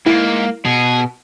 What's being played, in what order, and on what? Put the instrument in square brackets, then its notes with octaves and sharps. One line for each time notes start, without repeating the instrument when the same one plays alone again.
[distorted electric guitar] G#2 [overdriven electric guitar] A#3 [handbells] E4
[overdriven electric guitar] B2 [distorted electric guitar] G#4